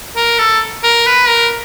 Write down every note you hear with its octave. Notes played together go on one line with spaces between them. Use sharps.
A#4
A4
A#4
B4
A#4